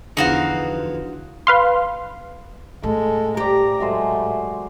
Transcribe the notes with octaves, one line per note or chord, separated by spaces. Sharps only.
E2 D3 F3 B3 D#4 F#4 F5
B4 F5 C6
A2 G#3 A4
G4 C5 D5 A#5
F#3 G#3 A3 C5